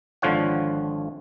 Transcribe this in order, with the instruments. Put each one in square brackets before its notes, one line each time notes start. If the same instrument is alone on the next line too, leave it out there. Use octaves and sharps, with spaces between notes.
[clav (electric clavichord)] G#1 D3 F3 F4 C#5 F#5